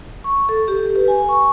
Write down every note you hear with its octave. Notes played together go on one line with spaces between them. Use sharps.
C#6
A4
G4
B4
G#5
C#6